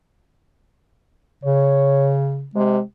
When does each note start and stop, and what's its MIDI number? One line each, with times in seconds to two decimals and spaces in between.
1.44 2.48 49
1.44 2.13 73
2.55 2.78 48
2.55 2.81 56